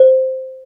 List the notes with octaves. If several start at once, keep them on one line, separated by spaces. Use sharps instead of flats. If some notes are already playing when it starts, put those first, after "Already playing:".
Already playing: C5